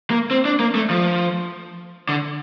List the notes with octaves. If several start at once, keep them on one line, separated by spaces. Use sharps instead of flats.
A#3
C4
D4
A#3
A3
F3
D3